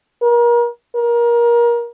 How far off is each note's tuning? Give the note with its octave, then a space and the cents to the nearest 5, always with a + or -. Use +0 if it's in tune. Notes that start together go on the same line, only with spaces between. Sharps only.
A#4 +35
A#4 +25